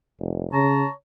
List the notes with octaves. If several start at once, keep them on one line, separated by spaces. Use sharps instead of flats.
F1
C#3 C#5 A5 A#5